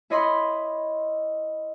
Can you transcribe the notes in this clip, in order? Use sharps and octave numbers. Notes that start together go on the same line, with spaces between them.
E4 C#5 D#5 B5 C6